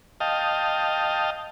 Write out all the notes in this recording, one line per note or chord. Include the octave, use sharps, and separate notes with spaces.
D#5 F5 G5 A5